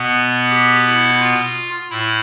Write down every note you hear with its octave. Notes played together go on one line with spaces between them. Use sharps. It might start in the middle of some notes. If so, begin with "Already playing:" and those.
Already playing: B2 B3
G4
E4
F4
A2 E4